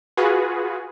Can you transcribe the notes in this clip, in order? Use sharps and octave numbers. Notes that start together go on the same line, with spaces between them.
F4 F#4 G#4 B4